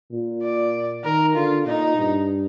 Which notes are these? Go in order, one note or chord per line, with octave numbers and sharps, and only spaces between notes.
A#2
D5
D#3 A#4
D3 F4
A#2 D#4
G2